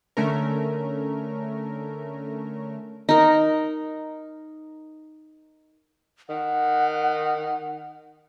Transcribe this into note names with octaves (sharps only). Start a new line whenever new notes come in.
D3 A3 C#4 A#4
D#4 A#4
D#3 F#5